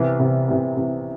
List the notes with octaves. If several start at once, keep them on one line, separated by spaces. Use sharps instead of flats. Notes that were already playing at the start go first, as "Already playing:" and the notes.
Already playing: C2 C3 E3 B3
C2 C3 E3 B3
C2 C3 E3 B3
C2 C3 E3 B3